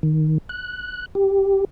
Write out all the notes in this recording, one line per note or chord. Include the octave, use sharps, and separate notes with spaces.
D#3
F#6
G4